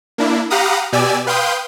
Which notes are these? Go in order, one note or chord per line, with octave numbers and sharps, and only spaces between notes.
A#3 D4 E4
G4 F5 F#5 A#5 B5 D#6
B2 G4 D5 G#5 E6
B4 F5 G5 C6 D#6 G6